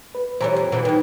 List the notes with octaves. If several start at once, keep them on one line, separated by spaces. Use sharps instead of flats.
B4
E3 G3 C5 C#5 A#5
F2
B2 D3 E3
D#3 E3